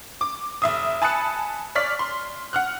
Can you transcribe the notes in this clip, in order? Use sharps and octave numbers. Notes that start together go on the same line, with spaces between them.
D6
F1 E5 D#6
G#5 A5 B5 D#6 F#6 C#7
C#5 D5 F6 B6
C6
F#5 F6 F#6